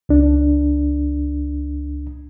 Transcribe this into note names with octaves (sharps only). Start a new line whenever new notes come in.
C#2 D4